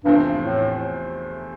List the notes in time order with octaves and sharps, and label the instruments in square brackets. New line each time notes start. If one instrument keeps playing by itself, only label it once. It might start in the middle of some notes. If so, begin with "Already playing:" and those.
[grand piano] E2 C3 F3 A3 C4 [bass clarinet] G2
[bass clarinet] A2